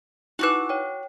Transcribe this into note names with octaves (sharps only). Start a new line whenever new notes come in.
D#4 E4 F#4 B4 D6 F#6
C#5 G5